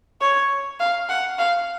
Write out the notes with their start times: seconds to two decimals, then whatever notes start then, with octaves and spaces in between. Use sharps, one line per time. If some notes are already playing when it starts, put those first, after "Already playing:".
0.21 C#5
0.80 F5
1.09 F#5
1.38 F5